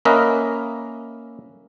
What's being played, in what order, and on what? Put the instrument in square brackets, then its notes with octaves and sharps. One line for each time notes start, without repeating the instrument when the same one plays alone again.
[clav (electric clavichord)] A#3 C#4 A#4 B4 D#5 E5